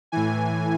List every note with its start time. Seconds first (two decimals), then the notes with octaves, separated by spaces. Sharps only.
0.12 A2 E3 G#5